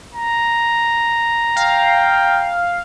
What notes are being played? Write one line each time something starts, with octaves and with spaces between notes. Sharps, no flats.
A#5
F5 G5